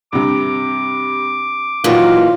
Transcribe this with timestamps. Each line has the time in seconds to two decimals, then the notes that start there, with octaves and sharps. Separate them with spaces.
0.13 G2 C3 D6
1.84 D#2 A#2 D#3 E3 F#3 F4